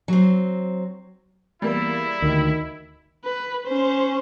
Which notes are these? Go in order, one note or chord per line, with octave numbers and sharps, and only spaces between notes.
F#3 C4
E2 G3 A#3 E4
D2 D#3
B4
C#4 C5